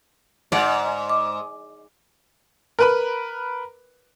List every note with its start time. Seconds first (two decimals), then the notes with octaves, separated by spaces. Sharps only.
0.52 G#2 D5 F#5
1.10 D6
2.79 A#4 B4 B5